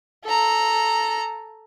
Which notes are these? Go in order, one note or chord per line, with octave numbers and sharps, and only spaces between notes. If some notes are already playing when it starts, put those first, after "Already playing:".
A4 A#5